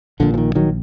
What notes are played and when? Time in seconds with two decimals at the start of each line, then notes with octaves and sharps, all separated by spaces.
0.20 A#1 A#2 D3
0.34 F3
0.38 D#3
0.55 D#3 F#3